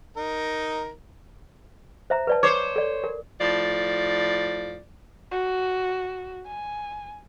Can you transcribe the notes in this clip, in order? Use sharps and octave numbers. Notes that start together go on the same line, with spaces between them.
D#4 A#4
C5 E5 A#5
B4 D5 A5
C5 C#5 D6
A4 D5
A#4
A2 F3 D5
F#4
G#5